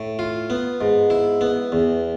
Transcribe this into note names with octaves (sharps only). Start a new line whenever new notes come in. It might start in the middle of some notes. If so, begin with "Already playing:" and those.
Already playing: A2
F4
B3
G#2
E4
B3
E2